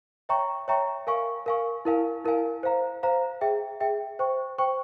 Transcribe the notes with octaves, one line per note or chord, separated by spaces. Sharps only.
C#5 E5 G5 A#5 C#6
C#5 E5 G5 A#5 C#6
A#4 F5 G#5 C#6
A#4 F5 G#5 C#6
E4 A#4 F5 G#5
E4 A#4 F5 G#5
C5 F5 A#5
C5 F5 A#5
G#4 E5 G5
G#4 E5 G5
C5 G5 C#6
C5 G5 C#6